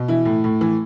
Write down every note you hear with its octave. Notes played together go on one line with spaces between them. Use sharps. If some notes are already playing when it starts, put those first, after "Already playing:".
Already playing: B2
E3 E4
A2
A2
E3